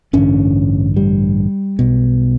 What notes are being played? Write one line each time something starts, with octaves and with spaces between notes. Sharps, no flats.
A1 G2 D3 C#4
G3
B1 B2